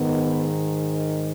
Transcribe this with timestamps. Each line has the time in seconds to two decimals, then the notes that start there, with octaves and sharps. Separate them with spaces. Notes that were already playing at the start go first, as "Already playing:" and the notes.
Already playing: G#2 D#3 B3